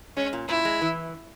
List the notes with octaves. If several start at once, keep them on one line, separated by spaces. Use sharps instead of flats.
G#3 C#4
A#2
A#2 E4
G#3
E3